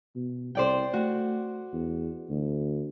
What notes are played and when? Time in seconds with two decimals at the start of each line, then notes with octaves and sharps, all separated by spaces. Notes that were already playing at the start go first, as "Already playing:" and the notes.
0.15 B2
0.55 C2 C5 D5 G5
0.93 A3 F#4
1.73 E2
2.29 D2